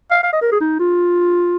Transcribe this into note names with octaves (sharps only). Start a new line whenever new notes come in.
F5
F5
D#5
A#4
G#4
D#4
F4